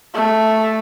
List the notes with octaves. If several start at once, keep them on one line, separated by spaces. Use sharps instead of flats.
A3